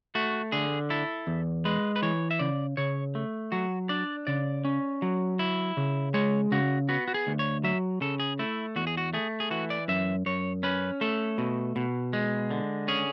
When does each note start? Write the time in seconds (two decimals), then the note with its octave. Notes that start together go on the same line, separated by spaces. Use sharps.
0.15 A3 F#4
0.52 D3 G#4
0.90 E4 A4
1.27 E2
1.65 G#3 B4
1.96 B4
2.02 E3 C#5
2.31 E5
2.39 C#3 D5
2.77 C#3 C#5
3.15 A3
3.52 F#3 F#4
3.89 D4 D5
4.27 C#3 D5
4.65 C#4
5.02 F#3
5.39 E4
5.77 C#3
6.14 G#3 C#5
6.52 C#3 F#4
6.89 B3 F#4
7.08 F#4
7.14 G#4
7.27 D2
7.39 C#5
7.64 F#3 E5
8.01 C#3 A4
8.20 G#4
8.39 A3 E4
8.76 E2 F#4
8.87 G#4
8.97 F#4
9.13 A3 G#4
9.40 G#4
9.51 E3 F#4
9.70 D5
9.88 F#2 E5
10.26 F#2 C#5
10.63 C#4 B4
11.01 A3 A4
11.38 B2
11.76 B2
12.13 G#3
12.51 D3
12.88 C#4 G#4